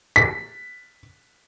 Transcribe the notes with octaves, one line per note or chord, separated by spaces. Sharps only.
B6